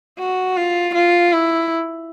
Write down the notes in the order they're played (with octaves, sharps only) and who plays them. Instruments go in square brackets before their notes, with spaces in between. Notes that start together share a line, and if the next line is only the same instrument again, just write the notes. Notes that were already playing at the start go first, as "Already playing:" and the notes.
[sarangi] F#4
F4
F4
E4